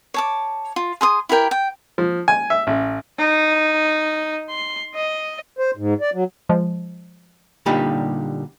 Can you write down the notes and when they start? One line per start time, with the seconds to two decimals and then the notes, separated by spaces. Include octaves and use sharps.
0.14 C#5 A5 D6
0.76 F4
1.01 G#4 C6 D#6
1.29 E4 G4 A#4 G5
1.51 G5
1.98 F3
2.28 G#5
2.50 E5
2.67 A1
3.19 D#4
4.49 C6
4.95 D#5
5.59 C5
5.77 G#2
6.01 D5
6.14 F#3
6.49 F3 G#3
7.66 A#2 D3 G3 D#4 G4 B5